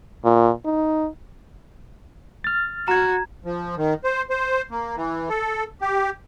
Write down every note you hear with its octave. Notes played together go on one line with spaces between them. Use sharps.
A#2
D#4
F6 A6
F#4 A#5 G#6
F3
D#3
C5
C5
A#3
E3
A4
G4